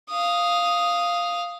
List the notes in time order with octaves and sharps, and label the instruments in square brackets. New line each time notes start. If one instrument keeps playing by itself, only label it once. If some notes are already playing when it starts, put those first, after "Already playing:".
[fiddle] F5 D#6